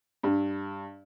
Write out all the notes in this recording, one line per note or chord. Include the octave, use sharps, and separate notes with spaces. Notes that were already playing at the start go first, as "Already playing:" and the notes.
G2